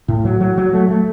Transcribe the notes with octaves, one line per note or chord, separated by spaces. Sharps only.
A2
F#3
F#3
F#3
A3
A3